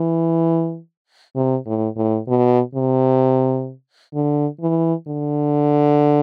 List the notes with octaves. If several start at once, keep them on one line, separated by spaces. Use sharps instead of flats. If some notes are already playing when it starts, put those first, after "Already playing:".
Already playing: E3
C3
A2
A2
B2
C3
D3
E3
D3